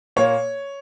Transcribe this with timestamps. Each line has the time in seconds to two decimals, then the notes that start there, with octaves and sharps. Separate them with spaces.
0.16 A#2 A#3 C#5